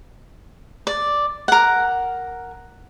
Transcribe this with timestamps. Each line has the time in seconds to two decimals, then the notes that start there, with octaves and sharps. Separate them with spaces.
0.87 D5
1.48 A#4 F#5